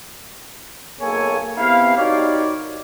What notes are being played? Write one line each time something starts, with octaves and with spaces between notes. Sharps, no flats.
B1 A#3 G#4 A4 C#5 G#5
C3 B3 E4 F5
D#4 F#4 G4 A#4 C#5 D5